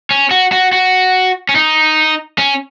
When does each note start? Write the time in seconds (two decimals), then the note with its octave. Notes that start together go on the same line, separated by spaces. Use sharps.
0.11 C#4
0.31 F#4
0.52 F#4
0.73 F#4
1.49 C#4
1.56 D#4
2.38 C#4